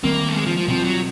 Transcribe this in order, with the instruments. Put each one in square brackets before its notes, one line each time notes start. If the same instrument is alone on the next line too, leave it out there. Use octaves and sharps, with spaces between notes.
[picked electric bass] D#3 G3 C4 [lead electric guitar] A#3
[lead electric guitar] A3
G#3
F3
F3
[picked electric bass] B2 G3 C4 [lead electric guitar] F3
[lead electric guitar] F#3